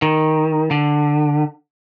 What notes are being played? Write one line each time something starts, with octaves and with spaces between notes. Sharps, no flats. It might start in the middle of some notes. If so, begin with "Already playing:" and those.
D#3
D3